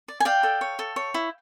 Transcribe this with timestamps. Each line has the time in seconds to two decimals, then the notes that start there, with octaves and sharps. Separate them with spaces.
0.08 D5
0.20 G#5
0.25 D5 F5 G5
0.43 A4
0.61 C#5
0.79 A4
0.96 C#5
1.14 E4